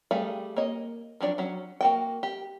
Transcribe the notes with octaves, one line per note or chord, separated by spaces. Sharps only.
G3 A3 G#4 F5
A#3 C#5 D#5
F3 F#3 D4 D5
F#3 C#4
A#3 F#4 G5
G4